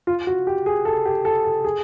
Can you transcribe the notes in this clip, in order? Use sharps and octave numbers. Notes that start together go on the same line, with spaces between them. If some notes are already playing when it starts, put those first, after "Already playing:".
F4
F#4
G4
G#4
A4
G4
A4
A4
G#4